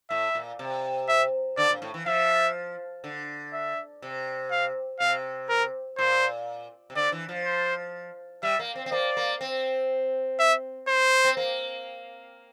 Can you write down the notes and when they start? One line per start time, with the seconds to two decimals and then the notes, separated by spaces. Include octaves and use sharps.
0.10 A2 E5
0.35 A#2
0.59 C3
1.08 E5
1.57 D3 D5
1.70 A#2
1.82 A2
1.94 E3
2.06 F3 E5
3.04 D3
3.53 E5
4.02 C3
4.51 F5
5.00 C3 F5
5.49 A#4
5.98 A#2 C5
6.90 C3
6.96 D3 D5
7.12 E3
7.29 F3
7.45 C5
8.43 G3 E5
8.59 A#3
8.75 C4
8.86 C4
8.92 A#3 D5
9.17 A#3
9.41 C4
10.39 E5
10.88 C5
11.24 C4
11.37 A#3